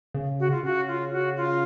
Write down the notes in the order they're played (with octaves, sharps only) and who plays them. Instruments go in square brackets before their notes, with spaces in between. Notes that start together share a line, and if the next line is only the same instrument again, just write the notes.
[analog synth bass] C#3
[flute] F#4
F4
[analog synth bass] C#3 [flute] F#4
[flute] F4
F#4
F4